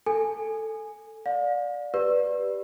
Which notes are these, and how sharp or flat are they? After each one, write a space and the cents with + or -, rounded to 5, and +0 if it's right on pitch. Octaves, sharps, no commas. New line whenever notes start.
A4 +0 G#5 +0
D5 +0 F5 +35
G4 +0 B4 +0 D5 +0